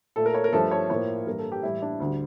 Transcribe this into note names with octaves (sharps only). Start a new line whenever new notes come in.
A#2 A3 A4
A#4
C#5
A#4
G2 F3 A3 A4
C#5
A2 F3 A#3 C#5
G2 E3 A#3 A#4
A4
G4
A2 E3 G3 E4
D4
D2 D3 G3